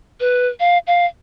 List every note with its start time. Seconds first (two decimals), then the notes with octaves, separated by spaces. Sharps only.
0.20 B4
0.60 F5
0.87 F5